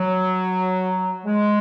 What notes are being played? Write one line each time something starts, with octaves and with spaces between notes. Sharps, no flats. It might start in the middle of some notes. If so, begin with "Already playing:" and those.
Already playing: F#3
G#3